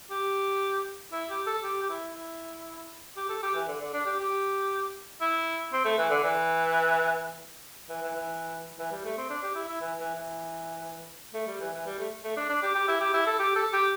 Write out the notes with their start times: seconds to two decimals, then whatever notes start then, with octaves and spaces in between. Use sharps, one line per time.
0.10 G4
1.12 E4
1.29 G4
1.46 A4
1.64 G4
1.82 G4
1.89 E4
2.15 E4
3.17 G4
3.29 A4
3.42 G4
3.55 E3
3.68 D3
3.81 D3
3.93 D4
4.06 G4
4.19 G4
5.21 E4
5.73 C4
5.85 A3
5.98 E3
6.10 D3
6.24 E3
7.89 E3
8.02 E3
8.15 E3
8.79 E3
8.92 G3
9.05 A3
9.17 C4
9.30 D4
9.43 G4
9.55 E4
9.68 E4
9.81 E3
9.98 E3
10.15 E3
11.34 A3
11.47 G3
11.60 E3
11.73 E3
11.86 G3
11.99 A3
12.24 A3
12.37 D4
12.49 D4
12.62 G4
12.75 G4
12.88 E4
13.01 G4
13.14 E4
13.26 A4
13.39 G4
13.56 A4
13.73 G4